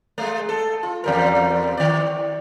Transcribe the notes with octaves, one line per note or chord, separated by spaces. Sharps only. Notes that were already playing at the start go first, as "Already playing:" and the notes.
G#3 A3
A4
F4
E2 G3 A#4
D#3 D5